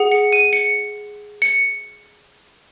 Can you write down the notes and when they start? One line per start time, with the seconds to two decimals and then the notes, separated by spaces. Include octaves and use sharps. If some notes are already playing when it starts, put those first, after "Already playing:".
Already playing: G#4 F#5
0.11 C#7
0.32 D#7
0.53 C#7
1.42 C#7